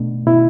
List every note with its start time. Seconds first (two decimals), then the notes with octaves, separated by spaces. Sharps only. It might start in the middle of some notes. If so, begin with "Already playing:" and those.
Already playing: B2 A3 D4
0.27 B2 E4